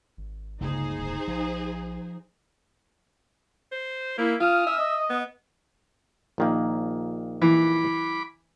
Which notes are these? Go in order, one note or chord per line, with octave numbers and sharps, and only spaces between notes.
G#1
G1 C#2 C#3 A#3 D#4 G#4 C5
D1
A#1 F3
C5
A#3 E4
C#4 F4 D#6 F6
E5
D#5
B3
A#1 D#3 A#3
E3 B5 D6